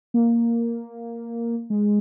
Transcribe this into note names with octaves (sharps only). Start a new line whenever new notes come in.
A#3
G#3